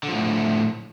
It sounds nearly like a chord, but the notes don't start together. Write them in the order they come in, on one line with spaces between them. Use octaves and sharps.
D3 F3 A2